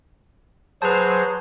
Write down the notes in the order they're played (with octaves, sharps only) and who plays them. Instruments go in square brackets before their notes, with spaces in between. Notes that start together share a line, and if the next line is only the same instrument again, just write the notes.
[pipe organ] F#3 G#4 C5 [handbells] B4 A5